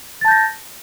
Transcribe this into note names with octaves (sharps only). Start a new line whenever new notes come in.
A5 G6 A6 A#6